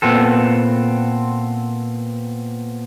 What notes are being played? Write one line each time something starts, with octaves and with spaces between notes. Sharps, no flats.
A#2 B3 C4 A4